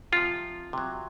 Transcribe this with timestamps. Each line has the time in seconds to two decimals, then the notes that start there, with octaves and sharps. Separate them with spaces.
0.12 C3 F3 F4
0.73 C3 F#3